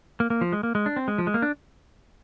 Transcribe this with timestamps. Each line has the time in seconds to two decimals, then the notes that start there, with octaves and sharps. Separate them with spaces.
0.20 A#3
0.30 A#3
0.41 F3
0.53 G#3
0.63 A#3
0.75 G#3
0.86 D4
0.96 C4
1.08 G#3
1.18 F3
1.27 G#3
1.34 A#3
1.42 D4